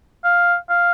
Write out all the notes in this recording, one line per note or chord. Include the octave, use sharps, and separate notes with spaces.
F5
F5